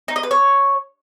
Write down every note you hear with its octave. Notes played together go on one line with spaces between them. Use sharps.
D#4
D#5
B4
C#5